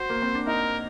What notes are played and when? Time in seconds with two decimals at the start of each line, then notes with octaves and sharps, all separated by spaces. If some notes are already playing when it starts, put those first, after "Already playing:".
Already playing: F#4 C5
0.10 A#3
0.22 C4
0.35 D4
0.47 D#4 A#4